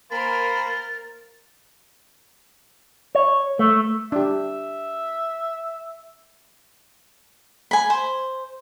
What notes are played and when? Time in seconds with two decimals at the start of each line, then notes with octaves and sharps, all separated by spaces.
0.11 A#3 A#4 C5 G#5 B5 A6
3.15 C#5
3.59 A3
4.12 D4 G4 E5
7.71 G#5 B5
7.90 C5